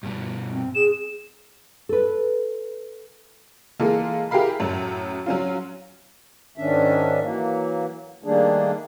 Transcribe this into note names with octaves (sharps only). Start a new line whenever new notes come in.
G2 B2
C4
G#4 E7
A4 B4
E3 G#3 A#3 F4 A4
E4 G4 G#4 A#4 F5 B5
F#2 A2 F#3
F#3 C#4 F4
G#2 D#3 C#4 D4 E5
E3 F#3 A#3
D#3 G3 A3 A#3 D4 G#4